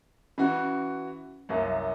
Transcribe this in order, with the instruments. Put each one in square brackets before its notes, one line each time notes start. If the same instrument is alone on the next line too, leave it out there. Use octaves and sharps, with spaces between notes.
[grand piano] E3 F#4 [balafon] C#4
[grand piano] C2 F#2 A#3